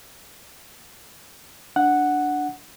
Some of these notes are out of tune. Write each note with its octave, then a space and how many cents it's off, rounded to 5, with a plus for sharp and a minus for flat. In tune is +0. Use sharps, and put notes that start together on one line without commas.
D4 +0 F#5 +0